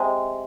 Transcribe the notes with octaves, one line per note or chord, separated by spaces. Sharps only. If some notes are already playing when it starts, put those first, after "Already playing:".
Already playing: C3 G#3